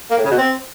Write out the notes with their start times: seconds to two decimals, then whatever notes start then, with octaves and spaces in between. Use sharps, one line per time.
0.10 A#3
0.17 A2
0.24 C#3
0.31 B2
0.38 C4